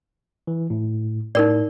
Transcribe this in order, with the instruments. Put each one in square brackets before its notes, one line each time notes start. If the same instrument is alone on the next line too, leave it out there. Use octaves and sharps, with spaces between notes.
[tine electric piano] E3
A2
[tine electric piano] A2 [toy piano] D#4 A#4 D5